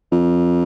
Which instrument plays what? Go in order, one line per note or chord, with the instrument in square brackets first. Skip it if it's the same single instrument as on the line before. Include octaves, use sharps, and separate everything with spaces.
[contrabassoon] F2